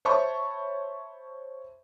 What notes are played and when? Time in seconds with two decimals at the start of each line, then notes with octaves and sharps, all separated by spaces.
0.05 C5 C#5 E5 A5 B5 C#6